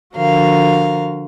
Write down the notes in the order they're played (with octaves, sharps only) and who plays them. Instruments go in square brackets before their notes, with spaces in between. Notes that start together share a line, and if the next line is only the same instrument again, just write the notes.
[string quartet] D3 F3 F#4 A#4 F5